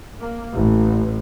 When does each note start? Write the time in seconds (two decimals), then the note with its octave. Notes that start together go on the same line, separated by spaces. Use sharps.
0.20 A#3
0.55 A1